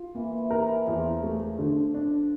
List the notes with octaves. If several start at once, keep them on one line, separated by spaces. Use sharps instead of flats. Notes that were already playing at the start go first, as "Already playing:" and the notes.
Already playing: F4
E3 A#3
E3
F3 A#4
E3
E2 F3
A3
D3
D4